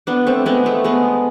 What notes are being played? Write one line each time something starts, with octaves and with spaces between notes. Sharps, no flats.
B3 D4
A3 C4
G#3 B3
A3
G#3 B3